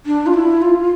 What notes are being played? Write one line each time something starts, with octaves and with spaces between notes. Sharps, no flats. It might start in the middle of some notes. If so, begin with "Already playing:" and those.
D4
F4
E4
F4